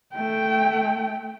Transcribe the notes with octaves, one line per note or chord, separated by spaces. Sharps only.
A3 G5